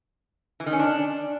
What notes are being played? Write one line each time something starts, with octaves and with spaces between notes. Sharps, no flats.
E3
D#3
C#4
D4